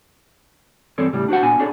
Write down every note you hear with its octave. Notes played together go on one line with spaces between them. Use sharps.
G2 E3 C4 A4 C#5 D5
A2 C#3 G3
D4 F#4 B4 C5 F#5
A#2 B3 D4 F#5 G#5
C#4 D4 G#4 A4 C#5 D5